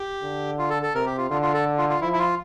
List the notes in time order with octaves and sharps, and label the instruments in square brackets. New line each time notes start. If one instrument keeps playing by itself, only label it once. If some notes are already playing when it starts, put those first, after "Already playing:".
Already playing: [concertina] G4
[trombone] D3
[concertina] F4
A4
A4
[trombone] C3 [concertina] A#4
[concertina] G4
F4
[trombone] D3 [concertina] F4
[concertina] F4
A4
F4
F4
[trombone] F3 [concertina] E4
[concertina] E4
F4